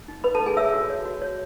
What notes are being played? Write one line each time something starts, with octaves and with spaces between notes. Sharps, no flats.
D#4
D#4 B4 B5
A4 A5
D#4
G#4 G#5
C#5 E5 E6
F#4
C#5
F#4
C#5